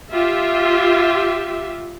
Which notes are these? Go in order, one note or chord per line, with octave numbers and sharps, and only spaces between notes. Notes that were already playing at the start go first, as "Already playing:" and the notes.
F4 G4 E5